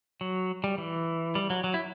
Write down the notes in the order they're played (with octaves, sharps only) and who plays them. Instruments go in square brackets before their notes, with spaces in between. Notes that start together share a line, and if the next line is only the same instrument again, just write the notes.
[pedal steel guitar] F#3
G3
E3
G3
F#3
F#3
E4